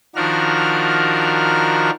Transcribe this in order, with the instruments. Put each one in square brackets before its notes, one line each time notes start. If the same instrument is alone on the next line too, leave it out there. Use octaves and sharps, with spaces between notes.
[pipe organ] D#3 F3 D4 F#4 A#4 F6